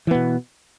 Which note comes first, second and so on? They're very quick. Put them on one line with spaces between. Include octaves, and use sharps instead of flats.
E3 B3 B2